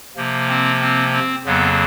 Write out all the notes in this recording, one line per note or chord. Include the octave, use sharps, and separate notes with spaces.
C3 F3 A#3
C4
C4
C4
F2 C#3 F#3 A#3 B3